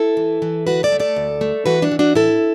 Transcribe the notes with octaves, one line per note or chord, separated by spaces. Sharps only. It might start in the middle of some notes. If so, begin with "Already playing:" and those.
Already playing: E4 A4
E3
E3
D2 F#4 B4
A4 D5
A3
A4 D5
D2
A3
E3 F#4 B4
D4 F#4
E3
D4 F#4
A2 E4 A4